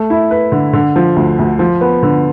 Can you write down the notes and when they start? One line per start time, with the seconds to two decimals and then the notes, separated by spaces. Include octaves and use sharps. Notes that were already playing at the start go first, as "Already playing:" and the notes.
Already playing: A3
0.10 E4
0.31 B4
0.52 D3
0.73 D3
0.96 F3
1.16 D2
1.39 D2
1.59 F3
1.81 B3
2.03 D3